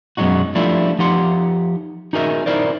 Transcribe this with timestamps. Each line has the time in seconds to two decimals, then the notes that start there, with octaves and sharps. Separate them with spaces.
0.17 F#2 B2 F#3 G#3 D#4 F#4
0.55 F3 G3 A3 D4 E4 F4
0.99 F3 D#4 G4 F#5 C6
2.13 D#4 F#4 G#4 A#4 D#5 E5
2.46 D#4 E4 A#4 C5 D5